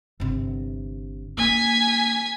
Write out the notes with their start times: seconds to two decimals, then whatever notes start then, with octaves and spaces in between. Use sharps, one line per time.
0.20 G1 C3
1.38 A#3 E4 G#5 B6